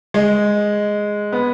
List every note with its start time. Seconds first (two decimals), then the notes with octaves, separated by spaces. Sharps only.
0.14 G#3
1.32 B3